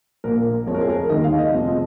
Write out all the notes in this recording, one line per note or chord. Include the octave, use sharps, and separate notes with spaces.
A#1 A#2 A#3 A#4
F2 F3 G#3 C#5
A#4
G#4
A#4
D#2 D#3 G#3 D#5
F5
D#5
F1 F2 F3 G#3